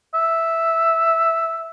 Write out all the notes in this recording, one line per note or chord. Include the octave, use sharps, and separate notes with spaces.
E5